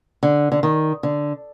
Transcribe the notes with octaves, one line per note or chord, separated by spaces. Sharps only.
D3
D3
D#3
D3